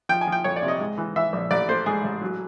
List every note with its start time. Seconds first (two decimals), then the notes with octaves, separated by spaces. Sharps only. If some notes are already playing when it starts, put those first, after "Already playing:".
0.09 F3 G5
0.21 G#5
0.27 F3
0.32 G5
0.44 F2 C#5
0.56 D5
0.62 C3
0.68 D#5
0.80 G#2
0.98 E3
1.16 E3 E5
1.33 A#1
1.51 A1 D5
1.69 A3 C5
1.86 G#2 G#4
2.04 A1
2.21 F#3